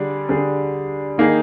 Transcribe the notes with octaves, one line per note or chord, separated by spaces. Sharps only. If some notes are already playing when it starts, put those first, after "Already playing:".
Already playing: D3 G3 D4 G#4
D3 G3 D4 G#4
D#3 A#3 D#4 G#4